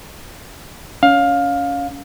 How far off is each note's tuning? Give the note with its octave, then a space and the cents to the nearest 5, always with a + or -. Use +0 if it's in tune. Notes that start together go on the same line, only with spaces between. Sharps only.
C#4 +20 F5 +15